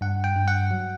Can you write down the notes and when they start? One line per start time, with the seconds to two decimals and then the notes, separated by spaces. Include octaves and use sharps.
0.01 G2 F#5
0.24 G5
0.35 G2
0.48 F#5
0.71 F#3